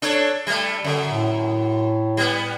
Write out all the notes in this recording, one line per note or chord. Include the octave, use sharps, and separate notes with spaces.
D4 A4 C#5
G3 A3
F#2 D3
A2
G3 B3